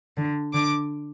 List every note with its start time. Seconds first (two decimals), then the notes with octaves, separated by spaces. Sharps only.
0.17 D3
0.54 D3 D6